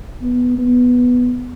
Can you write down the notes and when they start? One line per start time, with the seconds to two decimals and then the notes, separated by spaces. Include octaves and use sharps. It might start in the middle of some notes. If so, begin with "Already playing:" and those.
0.22 B3
0.58 B3